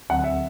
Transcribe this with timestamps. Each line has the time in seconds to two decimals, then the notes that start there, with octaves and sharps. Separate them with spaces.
0.09 D2 D3 F#3 C4 F#5
0.24 E5